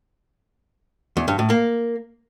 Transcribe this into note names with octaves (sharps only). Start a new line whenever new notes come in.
E2
G2
A2
A#3